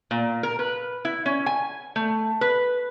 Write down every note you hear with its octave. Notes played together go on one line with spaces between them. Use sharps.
A#2
A#4
B4
E4
C#4
G#5
A3
B4